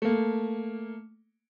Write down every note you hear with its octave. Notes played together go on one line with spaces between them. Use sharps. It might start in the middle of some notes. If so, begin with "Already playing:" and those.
A3 A#3